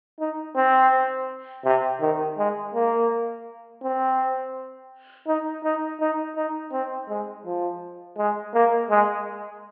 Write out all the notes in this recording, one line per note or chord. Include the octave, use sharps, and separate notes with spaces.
D#4
C4
C3
D#3
G#3
A#3
C4
D#4
D#4
D#4
D#4
C4
G#3
F3
G#3
A#3
G#3